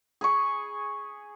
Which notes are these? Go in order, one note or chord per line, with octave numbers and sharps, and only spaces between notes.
G#4 B5 C#6